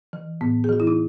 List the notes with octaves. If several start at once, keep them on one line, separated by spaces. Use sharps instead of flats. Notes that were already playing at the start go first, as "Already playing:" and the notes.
E3
A2 B3
G#4
E3 F#4
E4
D#4